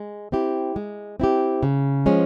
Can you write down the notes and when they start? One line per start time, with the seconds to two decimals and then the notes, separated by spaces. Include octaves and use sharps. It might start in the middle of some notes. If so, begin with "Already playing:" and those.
Already playing: G#3
0.32 C4 E4 G4
0.76 G#3
1.20 C4 E4 G4
1.63 C#3
2.06 F3 G#3 C#4